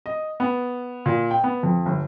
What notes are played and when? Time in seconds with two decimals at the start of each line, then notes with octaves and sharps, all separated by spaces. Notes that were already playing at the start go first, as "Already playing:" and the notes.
0.06 D#5
0.40 B3
1.06 A#2
1.31 G5
1.44 B3
1.63 F2
1.86 G1